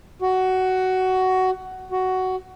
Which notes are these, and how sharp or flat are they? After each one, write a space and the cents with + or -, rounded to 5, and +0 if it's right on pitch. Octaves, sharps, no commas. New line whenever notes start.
F#4 +15
F#4 +10